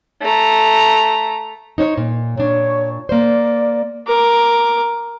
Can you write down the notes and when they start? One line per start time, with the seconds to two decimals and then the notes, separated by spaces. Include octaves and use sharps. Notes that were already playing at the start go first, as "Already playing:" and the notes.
0.22 A3 A#5
1.78 D#4 C5 C#5
1.98 A#2
2.37 A#2 D4 C#5
3.09 A#3 C5 D5
4.07 A#4 D6